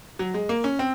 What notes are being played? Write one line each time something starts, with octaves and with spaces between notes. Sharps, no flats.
F#3
G#3
A#3
C#4
C4